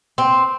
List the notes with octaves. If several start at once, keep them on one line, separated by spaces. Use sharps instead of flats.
C4